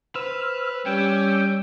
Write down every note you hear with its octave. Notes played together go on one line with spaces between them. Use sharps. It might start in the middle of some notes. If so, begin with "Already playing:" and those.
B4 C5 E6 F6
G3 C#4 G5 D6 E6 G6